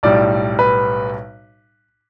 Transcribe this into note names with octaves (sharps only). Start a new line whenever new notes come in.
B1 A2 G3 D5
B4